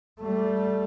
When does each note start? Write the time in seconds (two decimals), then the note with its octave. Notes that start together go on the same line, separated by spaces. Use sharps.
0.21 G3 A3